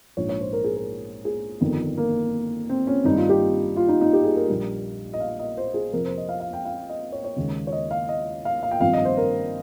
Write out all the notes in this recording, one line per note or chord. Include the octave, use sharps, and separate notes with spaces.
A#1 G#2 F3 C#5
C#5
C5
A#4
G#4
A#4
G#4
G1 F2 D#3
A#3
C4
C#4
G#1 G2 G3 D#4
F4
G4
F4
D#4
D#4
G4
G#4
A#4
A#1 A#2 G3
D#5
F5
D#5
C5
G#4
F2 C3 F3 A#4
C5
D#5
F5
F5
G5
F5
D#5
C#5
C#5
D#2 C#3 G#3
C#5
D#5
F5
D#5
F5
F5
G5
G#1 G2 F3 F5
D#5
C5
A#4